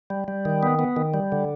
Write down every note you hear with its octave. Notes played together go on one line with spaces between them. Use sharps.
G3
G3
D#3
B3
B3
D#3
G3
D3